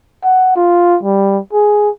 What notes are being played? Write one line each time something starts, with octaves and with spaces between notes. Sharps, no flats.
F#5
F4
G3
G#4